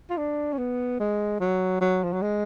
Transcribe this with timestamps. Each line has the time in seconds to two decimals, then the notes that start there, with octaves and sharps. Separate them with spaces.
0.10 F4
0.17 D4
0.52 C#4
0.58 B3
1.00 G#3
1.41 F#3
1.81 F#3
2.04 F3
2.13 F#3
2.22 G#3